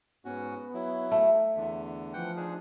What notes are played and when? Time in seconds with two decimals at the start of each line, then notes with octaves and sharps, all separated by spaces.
0.25 G#2 B3 C#4 F#4
0.74 F#3 E4
1.12 A3 E5
1.56 E2 D3
2.13 E3 F3 F#5 G5
2.36 D4 D#4 G#4